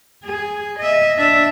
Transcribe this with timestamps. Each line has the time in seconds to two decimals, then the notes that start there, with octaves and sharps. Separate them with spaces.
0.24 G#4
0.79 D#5 E5
1.18 D4 E5